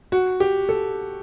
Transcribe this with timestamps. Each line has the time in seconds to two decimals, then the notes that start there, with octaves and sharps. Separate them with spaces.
0.12 F#4
0.40 G4
0.69 A4